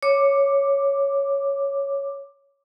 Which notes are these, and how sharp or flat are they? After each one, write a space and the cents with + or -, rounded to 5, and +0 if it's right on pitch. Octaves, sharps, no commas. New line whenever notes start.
C#5 +0 D6 +0